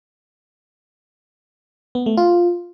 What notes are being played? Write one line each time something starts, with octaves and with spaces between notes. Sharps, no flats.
B3
A3
F4